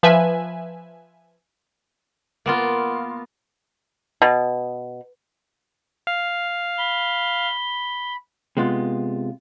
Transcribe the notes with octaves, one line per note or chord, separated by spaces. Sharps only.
F3 B4 E5 G#5
A#3 B3 F4
B2
F5
B5 G7
C3 G#3 B3 F4